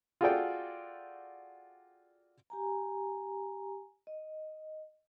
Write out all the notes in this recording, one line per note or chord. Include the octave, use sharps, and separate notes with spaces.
F4 F#4 G#4 A4 D5 G5
G4 G#5 A#5
D#5